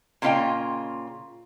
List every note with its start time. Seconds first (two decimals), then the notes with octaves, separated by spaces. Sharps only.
0.22 A#2 C#3 D4 F4 D#5 G5